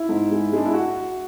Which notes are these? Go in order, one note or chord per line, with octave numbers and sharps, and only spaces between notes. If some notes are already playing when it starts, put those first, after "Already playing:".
Already playing: E4
G#2
G#3
G#3 D4
E4
F#4